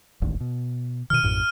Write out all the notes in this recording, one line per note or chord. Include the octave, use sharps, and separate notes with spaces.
E1 A1 D#2
B2
B2 D#3 F6 D#7
A#1 F#2 A2